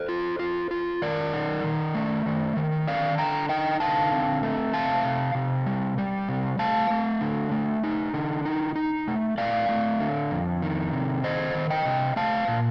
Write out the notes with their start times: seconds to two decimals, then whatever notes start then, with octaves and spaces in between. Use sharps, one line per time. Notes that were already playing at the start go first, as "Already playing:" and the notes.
Already playing: A4 C5
0.09 F4
0.39 F4
0.71 F4
1.02 D#3 A#4 D5
1.33 D#4
1.64 D#3
1.95 A3
2.26 D#3
2.57 D#3
2.87 D3 D5 F5
3.18 D3 G5 A#5
3.49 D#4 D#5 G5
3.80 D3 F5 A5
4.12 C4
4.43 A3
4.73 C3 F5 A5
5.05 C3
5.35 C3
5.66 G3
5.98 G3
6.29 C3
6.59 A3 F5 A5
6.90 A3
7.21 D3
7.52 A3
7.84 D#4
8.14 D3
8.45 D#4
8.76 D#4
9.08 A3
9.38 A3 D5 F5
9.69 A3
10.01 D3
10.31 F2
10.62 D#3
10.93 C3
11.24 D#3 C5 D#5
11.55 D#3
11.70 D#5 G5
11.85 C3
12.16 A3 F5 A5
12.48 A#2